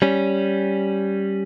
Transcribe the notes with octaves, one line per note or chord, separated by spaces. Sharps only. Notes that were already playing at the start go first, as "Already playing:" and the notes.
G3 C#4